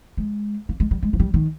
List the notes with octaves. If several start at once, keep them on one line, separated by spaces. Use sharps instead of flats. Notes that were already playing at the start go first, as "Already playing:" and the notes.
G#3
A#3
G#3
G3
G#3
F3
G3
D#3